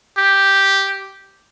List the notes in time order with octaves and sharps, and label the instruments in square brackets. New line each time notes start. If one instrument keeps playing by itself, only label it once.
[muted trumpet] G4